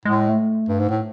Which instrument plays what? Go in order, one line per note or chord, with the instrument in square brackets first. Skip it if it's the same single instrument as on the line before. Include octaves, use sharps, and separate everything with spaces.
[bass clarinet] A2 [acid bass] G#3
[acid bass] A3
[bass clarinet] G2
G#2
A2